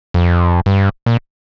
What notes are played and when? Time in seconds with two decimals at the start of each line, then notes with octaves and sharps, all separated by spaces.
0.14 F2
0.66 G2
1.06 A#2